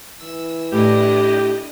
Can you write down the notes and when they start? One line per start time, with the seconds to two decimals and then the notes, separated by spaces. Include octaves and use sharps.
0.21 E3 E6
0.72 A2 D4 E4 G4 D#5